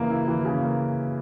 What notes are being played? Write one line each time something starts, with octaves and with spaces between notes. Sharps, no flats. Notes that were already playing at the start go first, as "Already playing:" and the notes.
Already playing: C#3 E3 A#3
E4
E3
C#3
A#3